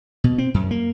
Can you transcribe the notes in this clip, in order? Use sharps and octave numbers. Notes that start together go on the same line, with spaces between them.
B2
C4
F#2
A#3